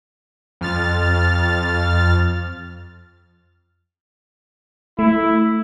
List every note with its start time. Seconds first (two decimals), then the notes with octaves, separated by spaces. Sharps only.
0.61 F2 F6 A6
4.99 A3 E4